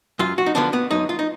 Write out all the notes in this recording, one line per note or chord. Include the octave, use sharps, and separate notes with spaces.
F#2 F4
F#4
D#4
D3 F3 B3 D4
B3
F#2 D#4
F4
D#4